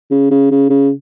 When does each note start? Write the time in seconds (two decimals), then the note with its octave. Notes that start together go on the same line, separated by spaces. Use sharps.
0.11 C#3
0.31 C#3
0.51 C#3
0.70 C#3